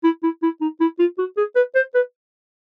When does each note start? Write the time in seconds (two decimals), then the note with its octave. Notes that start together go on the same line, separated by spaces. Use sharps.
0.04 E4
0.23 E4
0.43 E4
0.61 D#4
0.80 E4
0.99 F4
1.19 F#4
1.37 G#4
1.56 B4
1.75 C5
1.95 B4